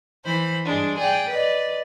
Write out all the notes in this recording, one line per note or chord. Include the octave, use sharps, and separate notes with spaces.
E3 C5 B5
G2 G#3 D4
G#4 D5 G5
B4 D5 D#5